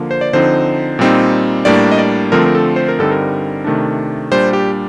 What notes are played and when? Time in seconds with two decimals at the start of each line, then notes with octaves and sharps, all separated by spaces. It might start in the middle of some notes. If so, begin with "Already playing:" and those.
Already playing: D3 F3 A#3
0.11 C5
0.21 D5
0.33 D3 F3 C4 D#4 C5
0.99 A#2 G3 C4 D#4
1.65 A2 G3 A#3 D4 D5
1.91 D#5
1.98 D5
2.32 D3 F3 A3 C4 A#4
2.46 A#4
2.55 A4
2.76 C5
2.88 A#4
2.99 G2 D3 G3 C4 D#4 A4
3.11 A#4
3.64 C3 D#3 A3 D4
4.31 A#2 G3 D4 C5
4.53 G4